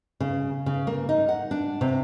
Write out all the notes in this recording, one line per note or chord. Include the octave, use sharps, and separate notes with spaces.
C#3
C#3
A#3
D#4
F#5
D4
C3